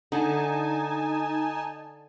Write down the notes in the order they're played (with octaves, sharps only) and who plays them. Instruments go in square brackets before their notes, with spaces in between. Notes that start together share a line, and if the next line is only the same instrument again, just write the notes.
[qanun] D3 [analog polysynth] D#4 G#5 A5